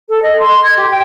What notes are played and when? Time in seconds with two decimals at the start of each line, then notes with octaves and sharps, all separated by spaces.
0.09 A4
0.22 D#5
0.39 C6
0.62 G#6
0.76 G4
0.89 G5